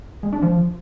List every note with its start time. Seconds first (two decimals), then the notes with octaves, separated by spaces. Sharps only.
0.23 G#3
0.33 D4
0.42 F3